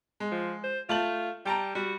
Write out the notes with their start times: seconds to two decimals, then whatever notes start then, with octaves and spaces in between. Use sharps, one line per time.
0.20 G#3
0.32 F3
0.64 C5
0.89 A3 F4 A5 F#7
1.45 G3 G5 A5 A#5
1.75 G3 F#4